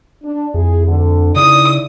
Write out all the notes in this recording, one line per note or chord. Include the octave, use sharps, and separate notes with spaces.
D4
F2 E4 G#4
D2 D3
C#3 D#4 E4 D5 D#6